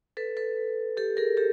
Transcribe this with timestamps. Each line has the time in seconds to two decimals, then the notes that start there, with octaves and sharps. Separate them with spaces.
0.17 A4 B4
0.37 A4 B4
0.97 G4 A4
1.17 G#4 A#4
1.37 G4 A4